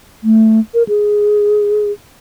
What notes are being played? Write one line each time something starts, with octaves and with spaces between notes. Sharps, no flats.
A3
A#4
G#4